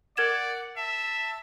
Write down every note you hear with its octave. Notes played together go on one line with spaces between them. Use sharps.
A#4 D5 F#5 G#6 E7
E5 A5